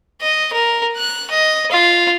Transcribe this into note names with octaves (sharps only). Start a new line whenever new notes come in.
D#5
A#4
F#6
D#5
F4